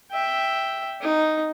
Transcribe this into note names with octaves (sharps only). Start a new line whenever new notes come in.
E5 G5
D#4